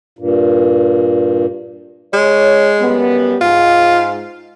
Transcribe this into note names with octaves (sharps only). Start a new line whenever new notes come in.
G2 A#2
G#3 C#5
F#2 G3 B3
G#2 F4